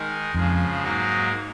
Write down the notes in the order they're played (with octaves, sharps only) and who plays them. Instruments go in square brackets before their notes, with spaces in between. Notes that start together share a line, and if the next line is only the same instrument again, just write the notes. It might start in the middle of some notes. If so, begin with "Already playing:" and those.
Already playing: [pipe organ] D#3 G#3 D#4 A#4
[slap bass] F2 [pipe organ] C#3 F3 G#3
[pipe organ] G#2 F#3 A#3 D#4 A#4